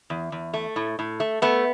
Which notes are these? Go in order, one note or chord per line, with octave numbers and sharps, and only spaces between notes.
E2
E2
A3
A2
A2
A3
A3 B3